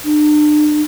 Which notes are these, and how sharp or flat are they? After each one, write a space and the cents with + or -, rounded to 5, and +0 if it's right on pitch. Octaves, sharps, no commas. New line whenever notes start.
D4 +40